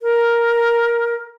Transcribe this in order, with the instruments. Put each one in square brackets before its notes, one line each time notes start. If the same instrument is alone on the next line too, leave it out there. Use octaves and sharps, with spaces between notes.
[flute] A#4